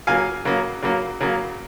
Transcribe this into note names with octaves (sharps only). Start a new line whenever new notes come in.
C#3 F#3 A#3 F5 G#5
C#3 F#3 A#3
C#3 F#3 A#3
C#3 F#3 A#3